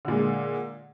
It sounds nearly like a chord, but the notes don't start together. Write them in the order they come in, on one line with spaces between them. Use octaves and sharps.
D3 A#2 G#3